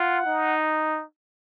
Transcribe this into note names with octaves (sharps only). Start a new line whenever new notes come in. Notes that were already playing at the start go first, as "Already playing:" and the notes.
Already playing: F4 F#5
D#4